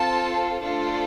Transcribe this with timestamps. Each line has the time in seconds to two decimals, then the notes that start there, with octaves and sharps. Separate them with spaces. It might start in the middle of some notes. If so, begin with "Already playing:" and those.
Already playing: C4 F4 A4 A5
0.61 A3 D4 F4 A4 C5